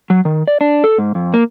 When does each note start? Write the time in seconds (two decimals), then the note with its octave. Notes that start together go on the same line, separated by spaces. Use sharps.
0.10 F#3
0.25 D#3
0.48 D5
0.61 D4
0.84 A4
0.98 G#2
1.15 F2
1.34 A#3